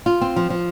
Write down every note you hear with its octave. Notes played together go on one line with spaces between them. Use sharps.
F4
C4
F3
F3